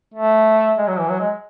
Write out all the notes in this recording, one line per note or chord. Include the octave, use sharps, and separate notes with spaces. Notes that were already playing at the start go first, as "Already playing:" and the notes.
A3
G#3
F#3
E3
F#3
G#3